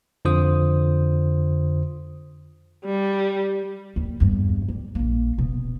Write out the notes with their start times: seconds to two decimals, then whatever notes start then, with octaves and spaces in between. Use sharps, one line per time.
0.25 F2 D3 F4 C5 D#6
2.84 G3
3.96 D#2
4.20 E2 G2
4.68 G3
4.95 A#1 A#3
5.38 D#1 B2